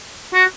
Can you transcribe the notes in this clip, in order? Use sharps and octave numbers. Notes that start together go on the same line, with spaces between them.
F#4